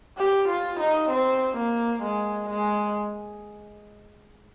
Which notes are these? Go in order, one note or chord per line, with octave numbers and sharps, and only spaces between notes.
G4
F4
D#4
C4
A#3
G#3
G#3